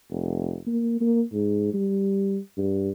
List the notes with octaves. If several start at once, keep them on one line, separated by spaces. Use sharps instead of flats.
F1
A#3
A#3
G#2
G3
G2